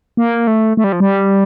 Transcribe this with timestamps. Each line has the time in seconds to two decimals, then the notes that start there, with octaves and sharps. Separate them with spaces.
0.17 A#3
0.47 A3
0.77 A3
0.84 G3
0.93 F3
1.00 G3